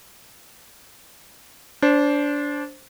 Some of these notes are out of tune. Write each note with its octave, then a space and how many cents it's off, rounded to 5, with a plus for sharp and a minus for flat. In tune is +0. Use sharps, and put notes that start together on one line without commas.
D4 -20 C5 +5